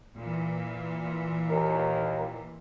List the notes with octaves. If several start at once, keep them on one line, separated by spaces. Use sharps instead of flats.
A#2 E3
D#2 A#4